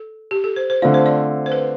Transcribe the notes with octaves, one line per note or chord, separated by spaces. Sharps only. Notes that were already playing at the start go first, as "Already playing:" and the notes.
Already playing: A4
G4
A4
C5
C5
D3 A3 C4 F4 D5
C5
D5
C5
B4